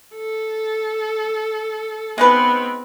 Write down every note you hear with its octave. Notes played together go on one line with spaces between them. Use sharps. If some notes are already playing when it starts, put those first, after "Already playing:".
A4
G#3 B3 C4 D#4 B4